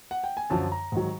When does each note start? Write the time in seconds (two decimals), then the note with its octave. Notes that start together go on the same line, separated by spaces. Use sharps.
0.11 F#5
0.24 G5
0.37 G#5
0.50 F#2 D3 F3 A5
0.72 A#5
0.92 G#2 D#3 F#3